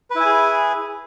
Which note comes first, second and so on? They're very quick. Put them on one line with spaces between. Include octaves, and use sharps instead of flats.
B4 E4 G#5 G#4